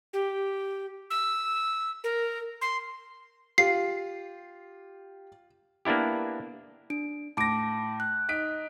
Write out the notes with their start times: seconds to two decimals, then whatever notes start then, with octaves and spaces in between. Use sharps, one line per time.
0.13 G4
1.10 E6
2.04 A#4
2.61 C6
3.58 F4 G4 C7
5.85 A#3 B3 D4 E4 G4
6.90 D4 D7
7.37 A2 A5 D6 A#6 D7
8.00 F#6
8.29 D#4 B6 D7